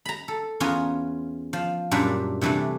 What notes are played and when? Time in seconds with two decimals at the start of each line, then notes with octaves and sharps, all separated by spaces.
0.05 A#5 B5
0.28 A4
0.60 E2 B3 C#4 F4 G#5 A#5
1.53 F3
1.91 F#2 A#2 G3 D4 G4 E5
2.41 C3 E3 G3 A3 D4